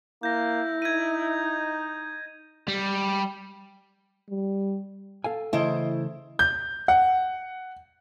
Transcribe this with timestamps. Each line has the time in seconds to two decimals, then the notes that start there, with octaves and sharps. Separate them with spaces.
0.23 A#3 E4 G6 A#6
0.82 D#4 G#6 D#7
2.68 G3
4.29 G3
5.24 A4 F5 G#5
5.53 C#3 E3 A3 E4 C5 D#5
6.39 G6
6.88 F#5